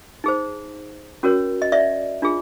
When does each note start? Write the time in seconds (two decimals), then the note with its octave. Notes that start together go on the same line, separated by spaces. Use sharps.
0.24 D#4 G#4 C5
1.23 C#4 F#4 A#4 C#5
1.62 D#5
1.72 D5 E5
2.22 D4 F4 G#4